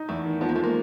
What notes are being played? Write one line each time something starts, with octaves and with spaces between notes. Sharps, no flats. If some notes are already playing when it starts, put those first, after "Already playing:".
Already playing: D#4
E2 A3
D#3
F3 B3
A#3
A3
G#3
A#3